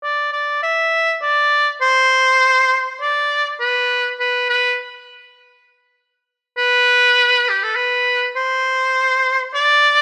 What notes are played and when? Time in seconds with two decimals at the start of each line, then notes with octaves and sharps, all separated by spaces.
0.03 D5
0.32 D5
0.63 E5
1.22 D5
1.81 C5
3.01 D5
3.60 B4
4.20 B4
4.49 B4
6.57 B4
7.49 G4
7.63 A4
7.76 B4
8.36 C5
9.55 D5